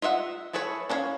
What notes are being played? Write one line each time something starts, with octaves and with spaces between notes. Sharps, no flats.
F4 D#5 E5 F#5
E4 G#4 A4 B4 C#5
C#4 D4 E4 C#5 F5